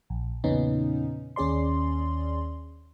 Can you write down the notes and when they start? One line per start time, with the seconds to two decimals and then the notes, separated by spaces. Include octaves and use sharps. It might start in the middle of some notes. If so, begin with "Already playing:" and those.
0.10 A#1
0.44 E2 A#2 C#3 B3 C#4 D#4
1.36 D#2 C#4 G#4 D5 C6